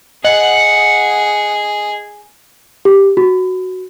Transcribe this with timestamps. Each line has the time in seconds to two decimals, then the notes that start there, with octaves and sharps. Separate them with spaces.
0.25 G#4 D#5 F#5
2.85 G4
3.17 F#4